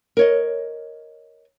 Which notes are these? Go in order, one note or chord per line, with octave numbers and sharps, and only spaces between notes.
A#4 C#5 D#5